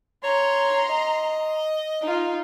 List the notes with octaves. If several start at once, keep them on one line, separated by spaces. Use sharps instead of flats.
C#5 A#5 C6
D#5
D#4 F4